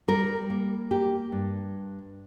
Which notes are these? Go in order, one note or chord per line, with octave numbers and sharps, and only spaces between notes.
G3 A#4
A#3
A#3 G4
G2